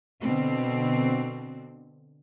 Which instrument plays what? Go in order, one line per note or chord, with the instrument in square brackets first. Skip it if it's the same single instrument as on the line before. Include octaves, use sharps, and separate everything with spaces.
[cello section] B2 D3 C4